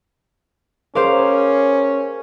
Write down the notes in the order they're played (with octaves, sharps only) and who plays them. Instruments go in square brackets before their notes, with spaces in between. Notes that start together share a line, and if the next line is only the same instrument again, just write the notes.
[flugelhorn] C#4 [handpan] G#4 A#4 [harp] C5 F5 D6